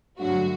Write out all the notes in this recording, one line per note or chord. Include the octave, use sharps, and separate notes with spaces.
G2 D3 F#3 A3 F#4